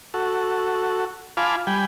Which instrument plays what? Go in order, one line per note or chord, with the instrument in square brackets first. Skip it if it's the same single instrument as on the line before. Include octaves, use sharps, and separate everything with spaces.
[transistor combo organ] F#4 A4
F4 F5 G#5 A5 B5 D6
G3 G5 G#5 B5